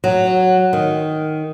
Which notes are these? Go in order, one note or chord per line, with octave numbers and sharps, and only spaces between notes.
F#3
D#3